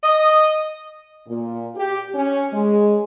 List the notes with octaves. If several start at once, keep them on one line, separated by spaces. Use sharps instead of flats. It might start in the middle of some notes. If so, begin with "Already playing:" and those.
D#5
A#2
G4
C#4
G#3